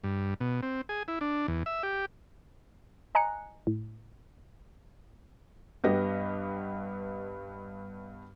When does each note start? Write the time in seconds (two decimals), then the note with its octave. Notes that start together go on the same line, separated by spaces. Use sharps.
0.04 G2
0.40 B2
0.63 C4
0.89 G#4
1.08 E4
1.21 D4
1.48 E2
1.66 E5
1.83 G4
3.15 D#5 G#5 A#5 F#6 C#7
3.67 A2
5.84 G2 B3 G4 D#5 A#6